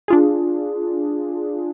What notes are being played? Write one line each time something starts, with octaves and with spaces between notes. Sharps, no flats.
D4 F4 G#4